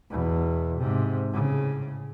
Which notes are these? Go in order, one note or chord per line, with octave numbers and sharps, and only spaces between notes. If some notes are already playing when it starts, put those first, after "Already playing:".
E2 B2
G#2 C3
A2 C#3